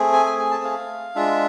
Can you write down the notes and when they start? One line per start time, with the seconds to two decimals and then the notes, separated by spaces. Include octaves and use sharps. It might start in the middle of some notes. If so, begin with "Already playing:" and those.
Already playing: A3 C4 G#4
0.13 G#5
0.26 G#5
0.39 G#5
0.51 A5
0.64 F5
1.15 G#3 D4 F4 E5